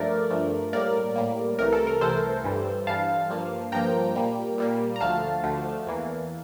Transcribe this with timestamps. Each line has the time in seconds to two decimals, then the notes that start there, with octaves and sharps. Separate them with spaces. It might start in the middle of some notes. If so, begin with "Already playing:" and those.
Already playing: G2 F3 A3 A#4 D5
0.30 G2 F3 A3
0.73 A2 G3 A#3 A#4 D5
1.16 A2 G3 A#3
1.59 C2 C3 E3 A3 A#4
1.73 A4
1.87 A#4
2.01 C2 C3 E3 A3 A4 C5
2.44 G2 E3 G3
2.87 G2 E3 G3 F5 A5
3.30 G2 F3 A#3
3.72 G2 F3 A#3 G5 A#5
4.15 A#2 G3 A#3
4.58 A#2 G3 A#3
4.96 A#5
5.01 D2 D3 F3 A3 F5 A5
5.44 D2 D3 F3 A3
5.87 E2 E3 A#3